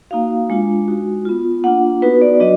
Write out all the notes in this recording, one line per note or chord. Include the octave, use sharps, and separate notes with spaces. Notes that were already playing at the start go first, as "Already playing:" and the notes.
A#3 D#4 F#4 F5
G#3 D4 F4
G#3 D#4 F#4
B3 F4
A#3 D4 F4 F#5
B3 D#4 F#4 B4
D5
F#3 D4 F#4 D#5